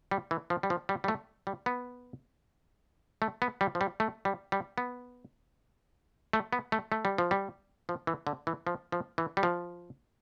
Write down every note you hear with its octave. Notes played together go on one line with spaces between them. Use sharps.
G3
E3
F3
G3
F3
G3
G3
A3
G3
B3
A3
B3
G3
F3
G3
A3
G3
G3
B3
A3
B3
A3
A3
G3
F3
G3
F3
E3
D3
E3
F3
F3
E3
G3
F3